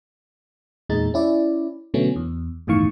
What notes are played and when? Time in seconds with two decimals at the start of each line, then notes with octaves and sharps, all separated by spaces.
0.89 E2 A#2 G#3 D#4 A6
1.14 C#4 E4 D5
1.94 B2 D3 F#3 A3 B3 C#4
2.16 E2
2.67 G1 E2 A2 D#3 F5 C#6